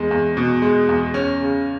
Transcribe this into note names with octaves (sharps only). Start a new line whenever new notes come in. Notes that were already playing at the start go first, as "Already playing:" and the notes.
Already playing: E2 G#3
E2
B2
G#3
E2
C#4
C#3